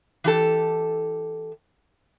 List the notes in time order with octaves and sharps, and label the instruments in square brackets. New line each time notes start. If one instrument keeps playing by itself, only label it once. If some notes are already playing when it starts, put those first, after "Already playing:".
[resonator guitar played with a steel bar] E3 G4 A4